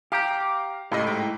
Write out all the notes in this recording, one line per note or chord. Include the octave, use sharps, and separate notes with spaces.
G4 F5 A#5
C#2 A2 G4 D#5
G#2 G5